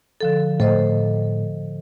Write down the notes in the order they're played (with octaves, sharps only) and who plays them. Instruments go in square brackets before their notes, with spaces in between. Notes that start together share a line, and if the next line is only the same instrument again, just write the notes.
[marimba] D3 F3 A4
[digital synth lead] A2 [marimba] A4 C5 D#5